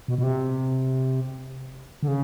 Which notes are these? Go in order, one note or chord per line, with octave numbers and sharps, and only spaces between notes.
B2
B2
C3
D3
C#3